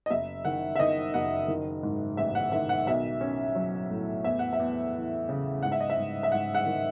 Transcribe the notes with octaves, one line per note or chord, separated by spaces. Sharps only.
D#5
F#1 E5
D#3 F#5
E5
D#3 D#5
F#1 F#5
D#3
G#2
A1 E5
F#5
D#3 E5
F#5
B1 E5
C#4
F#3
A2
E2 E5
F#5
E5
E2
E3
C#3
G#2 F#5
E5
D#5
E5
G#2
E5
G#2 F#5
F#5
D#3